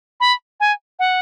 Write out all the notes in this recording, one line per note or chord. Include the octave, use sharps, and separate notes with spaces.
B5
G#5
F#5